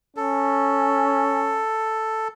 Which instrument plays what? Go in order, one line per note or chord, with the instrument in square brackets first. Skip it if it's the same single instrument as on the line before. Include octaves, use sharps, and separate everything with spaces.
[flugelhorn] C#4 [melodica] A4